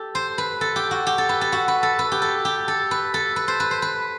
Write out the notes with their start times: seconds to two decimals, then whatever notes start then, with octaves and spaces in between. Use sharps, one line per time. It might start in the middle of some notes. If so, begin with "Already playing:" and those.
Already playing: G4 A4
0.15 C5
0.38 B4
0.61 A4
0.76 G4
0.91 F#4
1.07 G4
1.18 A4
1.29 B4
1.41 A4
1.52 F#4
1.68 B4
1.83 A4
1.99 B4
2.12 G4
2.22 A4
2.45 G4
2.68 A4
2.91 B4
3.14 A4
3.36 B4
3.48 C5
3.60 B4
3.71 C5
3.82 B4